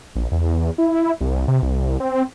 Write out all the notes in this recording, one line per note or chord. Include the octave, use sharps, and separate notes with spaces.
A#1
E2
E4
C2
C3
C2
C4